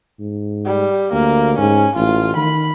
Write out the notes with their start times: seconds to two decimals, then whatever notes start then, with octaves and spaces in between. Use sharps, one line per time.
0.19 G#2
0.65 G3
1.12 D2 A#3
1.58 G#2 C#4
1.96 A1 F4
2.36 D#3 B5